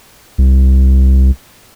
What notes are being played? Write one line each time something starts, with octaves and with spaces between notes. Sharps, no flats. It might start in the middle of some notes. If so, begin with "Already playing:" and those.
C2